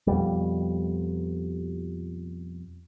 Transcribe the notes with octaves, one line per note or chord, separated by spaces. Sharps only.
F2 B2 G3